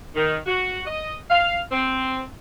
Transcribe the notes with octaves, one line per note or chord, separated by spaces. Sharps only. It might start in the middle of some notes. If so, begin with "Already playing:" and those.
D#3
F#4
D#5
F5
C4